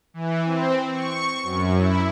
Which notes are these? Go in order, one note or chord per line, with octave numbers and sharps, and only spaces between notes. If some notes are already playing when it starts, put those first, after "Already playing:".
E3
C4
C#6
F#2
E4